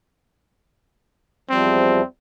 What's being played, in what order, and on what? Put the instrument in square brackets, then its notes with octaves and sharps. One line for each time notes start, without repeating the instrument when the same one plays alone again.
[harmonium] E2 F3 G3 [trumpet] C4